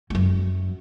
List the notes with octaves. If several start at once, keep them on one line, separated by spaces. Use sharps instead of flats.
F#2 F#3